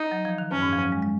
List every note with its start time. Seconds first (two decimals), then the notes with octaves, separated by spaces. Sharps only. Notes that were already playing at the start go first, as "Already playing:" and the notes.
Already playing: D#4
0.11 F#3
0.25 F3
0.38 D#3
0.51 F#2 C#4
0.62 G#2
0.72 F3
0.81 F#3
0.92 G#3
1.02 G#3